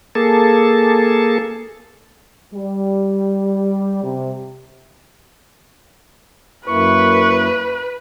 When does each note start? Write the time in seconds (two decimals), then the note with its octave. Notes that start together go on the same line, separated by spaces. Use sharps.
0.15 A#3 G#4 A4 A5
2.53 G3
4.03 C3
6.68 F#2 A#3 E4 B4 C#6